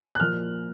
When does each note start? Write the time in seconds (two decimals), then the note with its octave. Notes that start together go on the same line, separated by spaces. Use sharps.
0.15 F#6
0.20 A#2 F3 A#3 F6